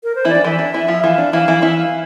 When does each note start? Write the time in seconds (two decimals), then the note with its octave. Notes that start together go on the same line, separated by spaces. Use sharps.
0.04 A#4
0.15 C5
0.25 E3 E4 D5
0.35 D4
0.44 E3 E4 E5
0.59 D4
0.74 E3 E4
0.88 F3 F4
1.04 E3 E4 F5
1.18 D4
1.33 E3 E4 F5
1.48 E3 E4
1.62 E3 E4 E5
1.78 F5